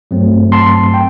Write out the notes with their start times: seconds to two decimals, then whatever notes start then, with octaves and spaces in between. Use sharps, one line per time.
0.11 G2 F#3 A3 C4
0.52 A5 C6
0.94 G5